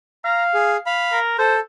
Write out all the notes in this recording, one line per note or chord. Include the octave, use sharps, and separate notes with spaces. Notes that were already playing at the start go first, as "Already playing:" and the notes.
F5 A#5
G#4
F5 B5
A#4
A4 C5